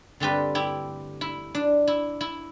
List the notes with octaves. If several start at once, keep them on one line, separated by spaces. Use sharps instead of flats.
G2 D3 A3 C4 G4 B4
E4 G4
E4
D4
E4
E4